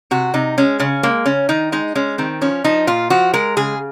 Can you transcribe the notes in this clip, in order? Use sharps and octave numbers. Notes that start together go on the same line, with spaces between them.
C3 F#4
C3 D#4
G#3 C#4
C#3 C#4
G#3 A#3
C#3 C#4
D#3 D#4
G#3 D#4
G#3 C#4
D#3 C4
F3 C#4
F3 D#4
A#2 F4
F3 F#4
G#3 A#4
C#3 G#4